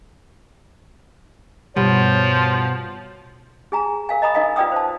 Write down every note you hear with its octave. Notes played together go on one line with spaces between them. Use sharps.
G2 B2 F3 G3 C#5
G#4 G#5 A#5
A#4 F5 G#5
D#5 A#5 B5 D#6
D#4 A#4 D#5 F5 G#5
F4 B4 D5 G5 D#6 E6
C5 A5